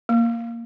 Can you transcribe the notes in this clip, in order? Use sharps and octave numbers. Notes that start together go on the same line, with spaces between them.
A#3